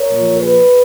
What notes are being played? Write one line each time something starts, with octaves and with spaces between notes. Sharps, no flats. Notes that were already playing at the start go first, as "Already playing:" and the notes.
Already playing: A#4 C#5
A#2 F3
G#4 B4